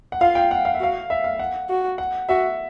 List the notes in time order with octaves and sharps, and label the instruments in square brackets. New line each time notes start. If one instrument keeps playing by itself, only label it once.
[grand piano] F#5
[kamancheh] F4 [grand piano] F5
[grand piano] G5
F#5
F5
E5
[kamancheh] F#4 [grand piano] F5
[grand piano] E5
F5
F#5
[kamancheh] F#4
[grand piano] F#5
[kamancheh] F#4 [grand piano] E5